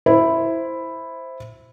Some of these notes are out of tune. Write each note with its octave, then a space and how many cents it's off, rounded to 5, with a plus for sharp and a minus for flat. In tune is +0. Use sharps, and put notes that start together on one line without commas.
E4 +0 C5 +0